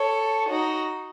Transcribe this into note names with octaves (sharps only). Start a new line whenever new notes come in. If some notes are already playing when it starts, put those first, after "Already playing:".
Already playing: A4 C#5
D#4 F#4